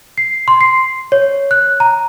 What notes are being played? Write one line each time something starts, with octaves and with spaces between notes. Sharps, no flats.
C7
C6
C7
C#5
F#6
A#5